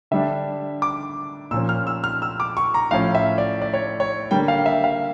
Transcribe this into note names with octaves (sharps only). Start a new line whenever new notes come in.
D3 G3 D4 E5
D6
A#2 F3 C#4 E6
F6
E6
F6
E6
D6
C#6
A#5
A2 F3 C#4 F5
E5
D5
D5
C#5
C#5
D3 G3 A#3 G5
F5
E5
F5